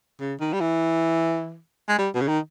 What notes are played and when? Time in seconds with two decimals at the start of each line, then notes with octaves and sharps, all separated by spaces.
0.20 C#3
0.40 D#3
0.53 G3
0.61 E3
1.89 G#3
1.98 G3
2.14 B2
2.21 C#3
2.28 D#3